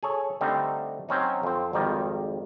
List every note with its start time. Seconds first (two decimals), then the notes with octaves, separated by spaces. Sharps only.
0.03 G#4 A4 C#5
0.41 D3 G3 A3 C4 D#4
1.09 F#3 C4 C#4 D#4
1.43 F2 C4
1.73 G#1 F2 D#3 G3 D#5